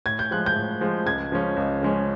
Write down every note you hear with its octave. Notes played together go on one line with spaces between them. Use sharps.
A2 G#6
G6
F3 G#3 F#6
G6
A2
F3 G#3
C#2 G#6
C#3 F3 G#3 C#4
C#2
C#3 F3 G#3 C#4